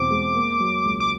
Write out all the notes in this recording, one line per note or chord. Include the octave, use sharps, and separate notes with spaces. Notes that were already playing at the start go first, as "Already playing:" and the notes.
Already playing: E2 B2 C4 D6
G#3
A#3
F#3
C#2
D6